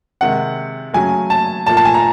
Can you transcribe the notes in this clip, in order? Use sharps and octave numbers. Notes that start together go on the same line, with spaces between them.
C3 D#3 G#3 F#5
C#3 F#3 A3 G#5
A5
A#2 F3 A3 A5
A5
G#5
A#5